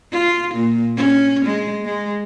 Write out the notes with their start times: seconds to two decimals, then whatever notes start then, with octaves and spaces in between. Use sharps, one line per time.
0.12 F4
0.55 A#2
0.97 C#4
1.46 G#3
1.85 G#3